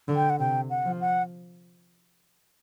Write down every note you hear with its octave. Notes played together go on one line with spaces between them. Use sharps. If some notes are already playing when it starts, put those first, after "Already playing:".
D3
G5
F#5
C3 G5
F#5
F3
F#5